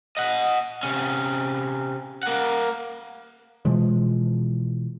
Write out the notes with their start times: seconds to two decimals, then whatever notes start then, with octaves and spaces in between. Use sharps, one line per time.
0.17 D#5 F#5
0.83 C3 C#4
2.23 A#3 F#5
3.65 B2 E3 F3 G#3